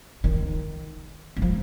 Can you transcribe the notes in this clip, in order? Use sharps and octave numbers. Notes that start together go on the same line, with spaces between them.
D#3
G3
F3